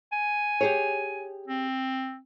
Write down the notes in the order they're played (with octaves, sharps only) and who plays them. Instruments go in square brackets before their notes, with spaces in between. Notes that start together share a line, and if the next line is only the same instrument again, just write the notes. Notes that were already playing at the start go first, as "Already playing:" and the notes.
[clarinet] G#5
[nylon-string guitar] G4 G#4 C#5
[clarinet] C4